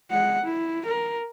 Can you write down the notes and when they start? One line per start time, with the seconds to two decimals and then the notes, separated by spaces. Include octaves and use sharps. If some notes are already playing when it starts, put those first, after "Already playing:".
0.11 G#3 F#5
0.43 E4
0.86 A#4